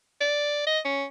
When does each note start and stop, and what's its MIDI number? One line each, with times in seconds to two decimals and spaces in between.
0.21 0.65 74
0.67 0.79 75
0.85 1.05 61